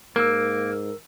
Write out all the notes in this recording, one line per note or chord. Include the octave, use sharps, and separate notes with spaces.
G#2 A#3 A#4 E6